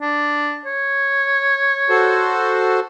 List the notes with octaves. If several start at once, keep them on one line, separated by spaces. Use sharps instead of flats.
D4
C#5
F#4 A4 C5